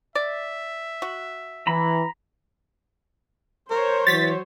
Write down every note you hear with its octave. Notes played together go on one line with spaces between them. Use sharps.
D5 E5
F#4
E3 A#5 B5
A#4 C5 C#5
E3 F#3 A6 B6